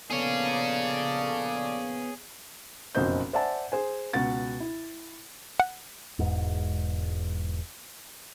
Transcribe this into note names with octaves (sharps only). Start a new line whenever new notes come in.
A#1 A#3 B3 G#4 A4 C#5 D5 F5
F#1 B1 F2 C5 D#5 G6
C5 D5 E5 F#5 G#5 A5
G#4 C5 G#5
C#2 B2 F#4 F#5 A6
E4
F#5
E1 E2 G#2